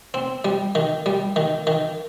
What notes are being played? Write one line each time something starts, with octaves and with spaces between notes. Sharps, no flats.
C4
G3
D#3
G3
D#3
D#3